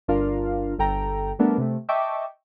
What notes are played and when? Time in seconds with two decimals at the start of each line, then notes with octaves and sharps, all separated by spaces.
0.08 G1 D4 F4 A#4 F5
0.79 G1 A4 G5 A#5
1.39 G3 A3 B3 D4 A#4
1.58 C3 A3
1.89 D#5 E5 G5 A5 C#6 D6